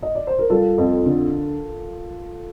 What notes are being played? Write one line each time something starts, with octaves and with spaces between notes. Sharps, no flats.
D#5
D5
C5
A#4
G3 F4 A4
F2
D3